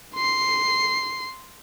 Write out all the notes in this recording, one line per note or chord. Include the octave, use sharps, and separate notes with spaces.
C6 C7